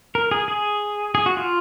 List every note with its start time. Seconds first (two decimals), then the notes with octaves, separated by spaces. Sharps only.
0.15 A#4
0.31 G#4
0.48 G#4
1.15 G#4
1.26 F#4
1.37 F4